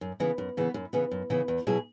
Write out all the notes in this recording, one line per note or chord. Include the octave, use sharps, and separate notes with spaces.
F#2
C#3 E3 B3
F#2
C#3 E3 B3
F#2
C#3 E3 B3
F#2
C#3 E3 B3
E2
B2 F#3 E4 G#4